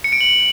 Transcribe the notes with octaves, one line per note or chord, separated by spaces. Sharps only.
C#7
D7
F#7